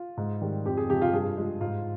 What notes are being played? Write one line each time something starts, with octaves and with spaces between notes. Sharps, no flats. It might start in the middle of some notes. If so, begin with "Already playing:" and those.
Already playing: F4
G#2
D#3 G3
F2 G4
G#4
C3 F3 G#3 G4
F4
G2 G#4
F3 G#3
G#2 F4